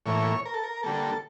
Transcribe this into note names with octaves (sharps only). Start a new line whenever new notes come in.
A2 E3 A#3 C#5
A#4
A4
A#4
D3 G3 A#3 A4